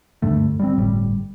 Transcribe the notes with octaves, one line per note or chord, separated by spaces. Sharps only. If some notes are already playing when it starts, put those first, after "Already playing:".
D2 G2 D3 A3
G3 G#3 C4
G1 A2 G3